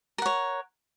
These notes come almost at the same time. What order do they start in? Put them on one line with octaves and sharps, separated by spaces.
A#4 F#5 C#5